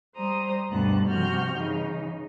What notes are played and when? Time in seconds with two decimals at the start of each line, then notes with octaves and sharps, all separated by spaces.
0.16 G3 C5 A#5 D#6
0.69 D2 G2 B2 D3 A5 F#6
1.06 G2 C3 F3 F#4 F6 G6
1.55 C#3 E3 D#4